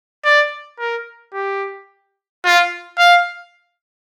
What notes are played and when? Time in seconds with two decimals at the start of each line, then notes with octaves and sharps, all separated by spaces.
0.25 D5
0.80 A#4
1.34 G4
2.45 F4
2.99 F5